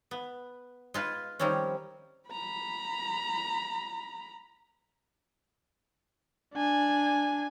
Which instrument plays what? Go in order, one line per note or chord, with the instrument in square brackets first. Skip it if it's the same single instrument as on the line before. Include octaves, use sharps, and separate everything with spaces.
[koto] B3
G#3 F4 B4
D#3 F3 G3 C4 C#4
[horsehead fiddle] A#5 B5
[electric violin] D4 G#5